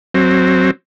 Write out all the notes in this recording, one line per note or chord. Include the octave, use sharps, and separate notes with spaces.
F#3 C4